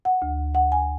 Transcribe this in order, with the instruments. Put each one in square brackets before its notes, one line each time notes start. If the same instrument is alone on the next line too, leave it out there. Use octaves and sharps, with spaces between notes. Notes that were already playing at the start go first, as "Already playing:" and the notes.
[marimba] F#5
D2
F#5
G#5